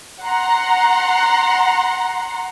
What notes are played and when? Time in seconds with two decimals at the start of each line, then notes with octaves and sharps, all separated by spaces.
0.22 F#5 A#5 C6